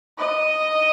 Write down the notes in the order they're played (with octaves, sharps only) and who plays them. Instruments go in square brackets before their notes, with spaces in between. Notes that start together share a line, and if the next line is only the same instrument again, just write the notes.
[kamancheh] D#5